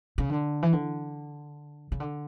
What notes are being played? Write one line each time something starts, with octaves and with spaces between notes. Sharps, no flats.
C#3
D3
E3
D3
C#3
D3